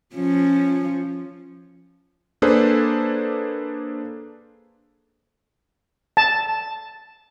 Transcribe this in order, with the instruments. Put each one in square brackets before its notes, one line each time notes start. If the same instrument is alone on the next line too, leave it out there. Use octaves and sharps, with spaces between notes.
[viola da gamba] F3 C#4
[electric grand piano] A#3 D4 G#4 A4 B4 C5
[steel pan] A5